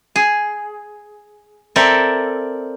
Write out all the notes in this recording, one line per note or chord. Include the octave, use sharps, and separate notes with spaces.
G#4
C4 A4 A#4 D5 E5